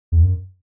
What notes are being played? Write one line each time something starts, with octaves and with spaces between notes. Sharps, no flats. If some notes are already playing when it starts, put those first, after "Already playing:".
E2
F#2